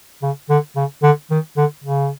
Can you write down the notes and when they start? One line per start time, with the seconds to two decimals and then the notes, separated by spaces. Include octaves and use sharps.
0.22 C#3
0.49 D3
0.76 C#3
1.02 D3
1.30 D#3
1.57 D3
1.84 C#3